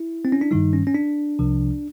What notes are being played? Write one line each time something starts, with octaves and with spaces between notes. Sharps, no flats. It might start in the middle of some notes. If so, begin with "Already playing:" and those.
Already playing: E4
C4
C#4
D4
G2 D#3 G3 D#4
C#4
C#4
D4
C2 C3 F3